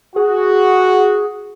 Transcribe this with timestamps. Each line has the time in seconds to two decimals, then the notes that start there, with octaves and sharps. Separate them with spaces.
0.16 F#4 G#4